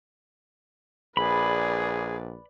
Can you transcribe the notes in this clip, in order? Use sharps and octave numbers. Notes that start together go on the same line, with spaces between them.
A#1 G#4 B4 D5 B5